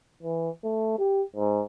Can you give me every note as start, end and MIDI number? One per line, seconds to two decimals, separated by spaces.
0.23 0.50 52
0.64 0.98 57
0.99 1.22 67
1.36 1.62 44